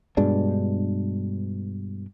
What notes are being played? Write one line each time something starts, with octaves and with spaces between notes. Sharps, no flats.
G2 B2 G#3 D4